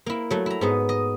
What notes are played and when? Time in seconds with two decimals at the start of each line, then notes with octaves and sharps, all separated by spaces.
0.06 A#3 E4
0.30 F#3 A3
0.46 E4 A#5
0.61 G#2 B3 D#5
0.89 D#5